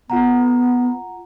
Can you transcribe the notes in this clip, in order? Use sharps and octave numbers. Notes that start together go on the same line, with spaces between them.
B3 F4 F#5 A#5